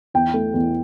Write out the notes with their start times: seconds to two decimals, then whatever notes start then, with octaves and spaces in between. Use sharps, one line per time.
0.14 E2 G5
0.34 A3
0.54 E2